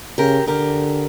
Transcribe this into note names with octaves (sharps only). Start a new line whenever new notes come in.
C#3 G4 A#4
D3 G4 A#4